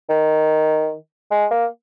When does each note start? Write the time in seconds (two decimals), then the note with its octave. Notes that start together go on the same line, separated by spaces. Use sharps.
0.10 D#3
1.31 G#3
1.51 A#3